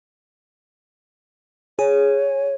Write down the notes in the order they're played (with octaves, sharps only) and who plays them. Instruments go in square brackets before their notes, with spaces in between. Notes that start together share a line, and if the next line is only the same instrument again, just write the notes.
[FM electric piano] G#4 [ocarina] C#5